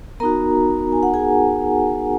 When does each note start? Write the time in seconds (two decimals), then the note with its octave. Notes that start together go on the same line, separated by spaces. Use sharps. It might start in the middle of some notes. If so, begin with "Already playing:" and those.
0.20 B3 D#4 F#4 A#4 A#5
0.92 G#5
1.03 F#5
1.14 G#4 G#5